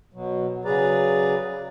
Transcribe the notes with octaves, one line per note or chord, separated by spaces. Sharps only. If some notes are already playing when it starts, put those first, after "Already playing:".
B2 F#3
C#3 F#3 G#4 B4 D5 A#5